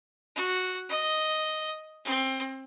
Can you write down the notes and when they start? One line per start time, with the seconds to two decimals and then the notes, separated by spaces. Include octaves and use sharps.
0.36 F#4
0.89 D#5
2.04 C4